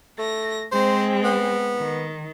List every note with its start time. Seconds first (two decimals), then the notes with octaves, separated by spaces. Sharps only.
0.18 A3 A#6
0.72 G#3 C4 C5
1.24 B3
1.77 D#3